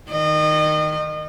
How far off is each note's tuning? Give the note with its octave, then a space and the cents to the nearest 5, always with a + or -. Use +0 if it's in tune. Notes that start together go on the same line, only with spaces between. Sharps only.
D#3 +0 D#5 -30